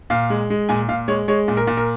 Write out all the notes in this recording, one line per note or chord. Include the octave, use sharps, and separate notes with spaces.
A#2 F5
G#3
G#3
A#2 G#5
A#2 F5
G#3 C#5
G#3 C#5
A#2
A#4
A#2
A#4